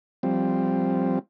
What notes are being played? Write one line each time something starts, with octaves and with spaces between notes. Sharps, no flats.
F3 G3 C4